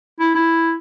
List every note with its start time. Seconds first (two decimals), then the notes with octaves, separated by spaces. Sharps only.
0.19 E4
0.35 E4